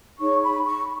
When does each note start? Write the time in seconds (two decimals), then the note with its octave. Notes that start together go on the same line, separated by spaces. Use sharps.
0.18 D#4 G#4 C#5 C#6
0.42 B5
0.65 C#6